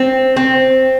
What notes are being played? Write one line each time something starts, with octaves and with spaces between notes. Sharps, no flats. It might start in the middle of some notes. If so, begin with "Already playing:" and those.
Already playing: C4
C4